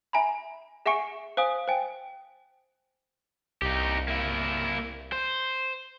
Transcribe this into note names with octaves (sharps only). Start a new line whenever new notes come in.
E5 G#5 A#5 B5
G#4 E5 F#5 G#5 C#6 C#7
C5 F5 G#5 D#6
C5 G5 G#5
C2 D#4 G4
A#3 E4
C5